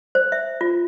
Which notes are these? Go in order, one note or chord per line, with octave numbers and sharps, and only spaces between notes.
C5
E5
F4